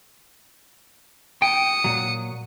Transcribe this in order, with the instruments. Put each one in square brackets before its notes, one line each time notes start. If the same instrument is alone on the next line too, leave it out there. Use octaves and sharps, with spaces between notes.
[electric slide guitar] G5 [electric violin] D#6 C#7
[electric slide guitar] A#2 F#3